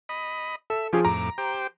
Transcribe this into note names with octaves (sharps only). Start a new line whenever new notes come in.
D#5 B5
A4 E5
F3 C#4 F4 G4 G#4
F2 A2 A#5 D6
G4 C5 G5